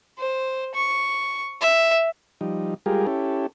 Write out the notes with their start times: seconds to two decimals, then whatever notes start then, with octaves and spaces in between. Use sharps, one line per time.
0.18 C5
0.74 C#6
1.61 E5
2.41 F3 G3 D#4
2.86 G3 G#3 F4 G4 G#4 A#4
3.07 C#4 E4 G4 A4